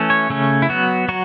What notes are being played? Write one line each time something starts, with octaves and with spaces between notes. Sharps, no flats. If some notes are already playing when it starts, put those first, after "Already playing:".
Already playing: E3 A3 C#4
C#5
C#3 A3 C#4
E4
F#3 B3 F#4
F#3 F#4